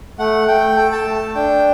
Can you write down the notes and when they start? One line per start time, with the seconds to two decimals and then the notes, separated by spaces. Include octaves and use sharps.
0.19 A3 F#5
0.48 A3 G5
0.77 A4
0.92 A5
1.06 A3
1.35 D4 G5